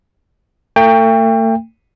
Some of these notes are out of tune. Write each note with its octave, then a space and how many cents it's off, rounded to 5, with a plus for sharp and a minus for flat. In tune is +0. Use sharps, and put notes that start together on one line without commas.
A3 +40 G5 +25